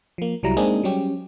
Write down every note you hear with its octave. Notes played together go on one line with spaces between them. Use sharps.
F3 A#3
C2 F#3 G3 E4 A#5
G#3 A#3 C4 D4 D#4 G#4
F#3 G3 C#4 G4